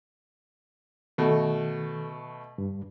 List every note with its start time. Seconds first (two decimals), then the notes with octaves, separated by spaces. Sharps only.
1.18 B2 D#3 A3 A4
2.58 G2